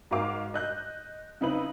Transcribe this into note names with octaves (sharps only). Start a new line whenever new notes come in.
G#2 F#4 A#4 F5 D6
D#5 F#6 G6
C#3 C4 D#4 E4 B4 F#7